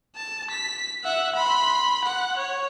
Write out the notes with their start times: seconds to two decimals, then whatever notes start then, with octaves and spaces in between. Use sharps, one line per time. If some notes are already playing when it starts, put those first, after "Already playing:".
0.16 A5
0.51 B6
1.04 E5 F#5
1.36 B5 C6
2.05 F#5
2.38 C#5